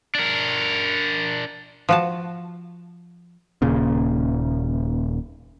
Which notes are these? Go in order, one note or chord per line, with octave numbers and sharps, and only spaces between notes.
D4 A#4
F3 F#4 A5
D#1 A#2 C#3